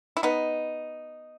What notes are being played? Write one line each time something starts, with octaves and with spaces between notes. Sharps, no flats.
E4
B3 D#4